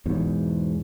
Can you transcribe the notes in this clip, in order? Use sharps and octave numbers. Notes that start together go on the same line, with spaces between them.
E2 G#2 B2